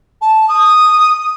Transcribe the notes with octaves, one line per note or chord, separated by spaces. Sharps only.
A5
D#6